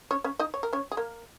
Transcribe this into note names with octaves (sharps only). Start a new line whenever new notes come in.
C#4 C#5
C#4 C#5
D#4 D#5
C#5
A#4
C#4 C#5
G#4
A#3 A#4